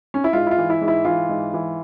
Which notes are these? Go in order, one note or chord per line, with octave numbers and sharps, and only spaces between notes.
C#4
E4
G#2 F4
E4
F4
E3
E4
G#2
E4
E3 F4
G#2
E3